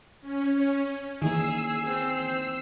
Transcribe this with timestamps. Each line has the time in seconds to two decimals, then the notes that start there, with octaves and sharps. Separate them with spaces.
0.21 C#4
1.22 D#3 E3 A#3 G#4 E6 C7
1.87 C4